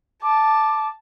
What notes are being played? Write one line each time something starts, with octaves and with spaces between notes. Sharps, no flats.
A5 D6